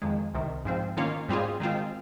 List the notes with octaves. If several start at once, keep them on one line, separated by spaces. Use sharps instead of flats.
F2 D#3 G#3
C2 C3 D#3
G#2 F3 C4
D#3 A#3 C#4 F4
G#2 G3 C4 F4 G#4
D#3 G#3 C4 F4